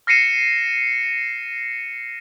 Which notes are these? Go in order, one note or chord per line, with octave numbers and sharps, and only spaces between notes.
F6 A#6 C7 C#7 D#7 E7